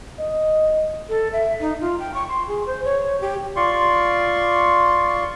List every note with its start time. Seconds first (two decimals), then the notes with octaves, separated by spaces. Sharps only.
0.19 D#5
1.09 A4
1.33 E5
1.61 D#4
1.81 F4
1.99 G5
2.14 C#6
2.28 C6
2.48 G#4
2.66 C5
2.85 C#5
3.21 G4
3.56 F4 D5 C6 C#6